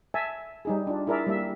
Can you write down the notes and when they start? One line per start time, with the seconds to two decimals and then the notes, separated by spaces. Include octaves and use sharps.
0.14 E5 G#5 A5
0.65 G3 D#4 G#4
0.87 D4 F4
1.07 E4 G#4 A#4 D5 E5
1.26 G3 A#3 E5